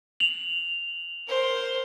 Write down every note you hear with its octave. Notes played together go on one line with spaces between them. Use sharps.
F7 F#7
A#4 C5